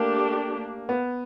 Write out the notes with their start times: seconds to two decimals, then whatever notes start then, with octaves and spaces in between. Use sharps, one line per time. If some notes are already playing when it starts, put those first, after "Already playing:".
Already playing: A3 A#3 D4 G4
0.89 B3